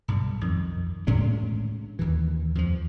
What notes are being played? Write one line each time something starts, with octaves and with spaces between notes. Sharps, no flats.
B1 G2
F2 D#3
A2 G#3 C#4 D4
D#2 E3
F2 F3